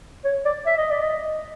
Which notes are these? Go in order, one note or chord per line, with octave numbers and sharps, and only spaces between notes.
C#5
D5
E5
D#5
D5
D#5